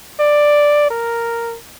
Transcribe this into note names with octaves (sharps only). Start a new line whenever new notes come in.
D5
A#4